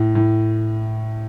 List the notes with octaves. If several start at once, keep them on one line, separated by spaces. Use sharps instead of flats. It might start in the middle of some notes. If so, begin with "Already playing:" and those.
Already playing: A2
A2